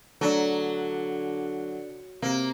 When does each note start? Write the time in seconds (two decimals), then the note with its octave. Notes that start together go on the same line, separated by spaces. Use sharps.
0.21 D3 F#3 A3 D4
2.22 C3 A#3